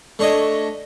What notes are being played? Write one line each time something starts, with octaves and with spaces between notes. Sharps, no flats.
A3 D4 C#5 D#5